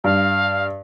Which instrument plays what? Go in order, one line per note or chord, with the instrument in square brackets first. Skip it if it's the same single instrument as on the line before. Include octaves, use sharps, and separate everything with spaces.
[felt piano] G2 [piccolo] F5